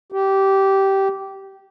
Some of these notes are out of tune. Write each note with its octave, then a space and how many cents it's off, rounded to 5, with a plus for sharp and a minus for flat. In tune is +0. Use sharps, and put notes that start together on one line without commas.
G4 -15